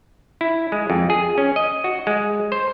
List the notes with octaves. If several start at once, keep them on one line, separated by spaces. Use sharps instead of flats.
E4
G#3
F2
G#4
C#4
D#5
F#4
G#3
C5